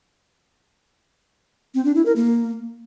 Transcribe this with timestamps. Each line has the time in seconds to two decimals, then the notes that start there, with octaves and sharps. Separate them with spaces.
1.75 C4
1.85 D4
1.95 E4
2.06 A#4
2.16 A#3